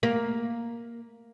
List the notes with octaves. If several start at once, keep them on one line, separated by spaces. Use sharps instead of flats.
A#3